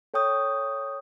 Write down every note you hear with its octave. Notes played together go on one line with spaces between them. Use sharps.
A4 C#5 G5 C#6 D#6 G6